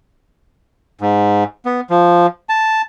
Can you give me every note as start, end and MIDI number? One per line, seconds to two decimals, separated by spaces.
1.01 1.44 44
1.65 1.81 59
1.90 2.27 53
2.49 2.82 81